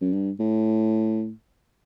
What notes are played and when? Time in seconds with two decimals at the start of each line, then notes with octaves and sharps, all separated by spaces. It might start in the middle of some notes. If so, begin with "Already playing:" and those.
0.01 F#2
0.13 G2
0.40 A2